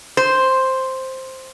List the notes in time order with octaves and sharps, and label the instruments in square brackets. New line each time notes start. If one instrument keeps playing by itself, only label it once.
[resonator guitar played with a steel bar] C5